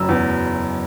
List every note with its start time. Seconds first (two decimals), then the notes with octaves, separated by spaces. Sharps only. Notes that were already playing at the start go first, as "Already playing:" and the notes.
Already playing: F#1 F#2 E6
0.09 E2